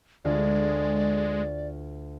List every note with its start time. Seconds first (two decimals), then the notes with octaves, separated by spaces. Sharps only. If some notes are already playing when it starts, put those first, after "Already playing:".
0.25 D2 G#3 F4 D5 F6